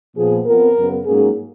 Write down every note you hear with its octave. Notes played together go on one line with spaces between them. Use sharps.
A#2 F3 B3 G#4
F2 F3 B3 A#4
F#2 C#3 F#3 B3
G#2 F#3 A#3 C#4 G#4